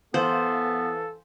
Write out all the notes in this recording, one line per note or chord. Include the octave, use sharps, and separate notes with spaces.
E3 B3 A4 C5 F5 F#7